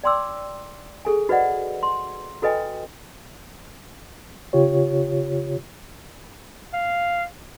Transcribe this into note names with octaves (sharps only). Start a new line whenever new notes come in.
D5 G5 C6 D6 E6
G#4 A4 G#5
F#4 B4 C5 D5 D#5 F#5
C6
F#4 A4 B4 D#5 G5 G#5
C#3 F4 G4 C#5
F5